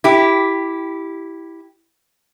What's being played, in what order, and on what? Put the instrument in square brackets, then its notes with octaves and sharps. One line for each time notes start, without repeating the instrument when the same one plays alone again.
[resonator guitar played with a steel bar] E4 G4